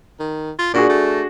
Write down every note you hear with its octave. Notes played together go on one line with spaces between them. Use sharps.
D#3
F4
A#2 D4 F#4 G#4
A3